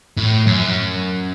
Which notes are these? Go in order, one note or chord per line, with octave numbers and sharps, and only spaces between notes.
A2
F#2